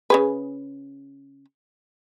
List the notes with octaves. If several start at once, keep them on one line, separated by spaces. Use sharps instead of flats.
C#3 G#4 B4